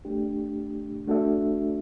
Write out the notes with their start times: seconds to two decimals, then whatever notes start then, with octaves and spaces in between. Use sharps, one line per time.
0.05 A3 D4 G4
1.07 A3 D4 F#4 A4 E5